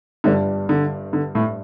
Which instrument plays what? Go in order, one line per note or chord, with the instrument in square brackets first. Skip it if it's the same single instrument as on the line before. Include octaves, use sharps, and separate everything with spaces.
[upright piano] G1 G2 G3 D4 [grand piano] D3
[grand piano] D3
D3
A2